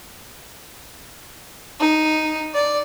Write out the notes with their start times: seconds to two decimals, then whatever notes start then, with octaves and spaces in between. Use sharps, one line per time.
1.80 D#4
2.54 D5